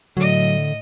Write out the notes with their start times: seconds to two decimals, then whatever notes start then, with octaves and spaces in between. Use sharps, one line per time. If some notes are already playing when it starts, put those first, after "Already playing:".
0.17 A2 D3 F#3 D#5